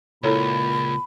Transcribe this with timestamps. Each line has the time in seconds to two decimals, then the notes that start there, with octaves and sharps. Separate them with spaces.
0.24 C#2 A#2 E4 A4 C#5 B5